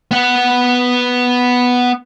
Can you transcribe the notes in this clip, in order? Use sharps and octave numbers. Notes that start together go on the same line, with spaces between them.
B3 F#5